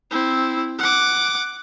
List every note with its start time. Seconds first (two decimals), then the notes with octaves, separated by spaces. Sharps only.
0.11 C4 E4
0.79 F#5 D6